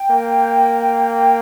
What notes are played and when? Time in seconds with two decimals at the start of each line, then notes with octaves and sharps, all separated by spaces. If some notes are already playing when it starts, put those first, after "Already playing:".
Already playing: G5
0.11 A#3